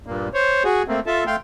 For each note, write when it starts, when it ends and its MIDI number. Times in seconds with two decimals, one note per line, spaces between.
0.06 0.28 43
0.06 0.28 46
0.06 0.28 58
0.34 0.63 72
0.34 0.63 73
0.64 0.83 66
0.64 0.83 68
0.88 1.00 57
0.88 1.00 58
0.88 1.00 60
1.07 1.24 65
1.07 1.24 69
1.07 1.24 76
1.07 1.24 81
1.27 1.36 57
1.27 1.36 77
1.27 1.36 79
1.27 1.36 84